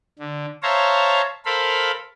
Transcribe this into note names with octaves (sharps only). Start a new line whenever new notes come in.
D3
C5 C#5 E5 F5 A5 A#5
A4 A#4 C5 F5 B5